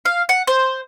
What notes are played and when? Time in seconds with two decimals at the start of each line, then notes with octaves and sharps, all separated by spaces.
0.05 F5
0.29 F#5
0.47 C5